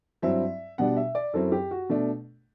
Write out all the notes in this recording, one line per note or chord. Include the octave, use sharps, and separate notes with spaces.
G2 F#3 C4 E4 E5
B2 G3 D4 F#5
E5
D5
F#2 F#3 C4 E4 A4
G4
F#4
B2 A3 D4